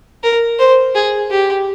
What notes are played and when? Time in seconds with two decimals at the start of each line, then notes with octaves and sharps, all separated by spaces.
0.23 A#4
0.59 C5
0.95 G#4
1.30 G4